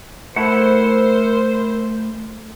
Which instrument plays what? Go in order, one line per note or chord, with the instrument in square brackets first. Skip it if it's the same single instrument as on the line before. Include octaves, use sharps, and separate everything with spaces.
[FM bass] A3 [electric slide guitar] E4 F#5 [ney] A#4 [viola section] C5